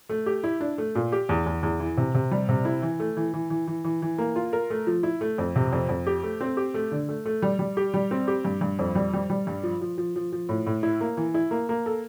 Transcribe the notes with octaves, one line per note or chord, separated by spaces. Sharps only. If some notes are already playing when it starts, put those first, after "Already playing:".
A3
G4
E4
D4
A3
A#2
G4
E2
E2
E2
E3
C3
C3
G3
C3
E4
E3
A3
E3
E3
E3
E3
E3
E3
A#3
F4
A#4
A3
F3
E4
A3
F2
C3
F2
F2
G4
A3
C4
G4
A3
D3
A3
A3
G3
G3
G4
G3
C4
G4
G2
G2
F2
G3
G3
G3
G2
F3
F3
F3
F3
F3
A2
A2
E4
A#3
E3
E4
A#3
A#3
A4